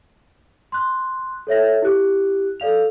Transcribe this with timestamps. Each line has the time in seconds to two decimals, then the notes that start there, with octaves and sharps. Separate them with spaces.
0.72 C6 F#6
1.47 A4 C#5 E5 A#6
1.82 E4 G4 F#6
2.60 A4 D5 F5 F7